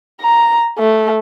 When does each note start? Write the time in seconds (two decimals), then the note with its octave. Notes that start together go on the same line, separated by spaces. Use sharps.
0.21 A#5
0.79 A3